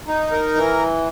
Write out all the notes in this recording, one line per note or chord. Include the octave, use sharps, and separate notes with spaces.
D#4
A#4
E3